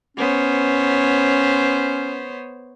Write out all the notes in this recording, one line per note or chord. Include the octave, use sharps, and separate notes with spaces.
B3 C#4 C5 C#5